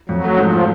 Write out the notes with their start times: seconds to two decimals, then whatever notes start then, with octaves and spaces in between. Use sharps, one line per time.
0.09 F2 F#3
0.24 A3
0.38 G#2 F3